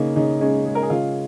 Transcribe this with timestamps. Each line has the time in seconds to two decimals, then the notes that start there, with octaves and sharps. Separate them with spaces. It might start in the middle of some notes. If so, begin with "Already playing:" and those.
Already playing: C#3 A#3 D#4
0.16 C#3 D#4
0.41 G#3 C#4
0.66 G#3
0.75 A#4
0.83 G#4
0.90 C#3 F4